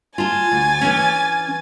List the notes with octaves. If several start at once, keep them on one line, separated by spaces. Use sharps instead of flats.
F4 G#5 A5 A6
D2
E3 C#4